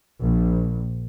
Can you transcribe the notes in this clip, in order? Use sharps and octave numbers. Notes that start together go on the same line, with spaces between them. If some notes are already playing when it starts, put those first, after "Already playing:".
A#1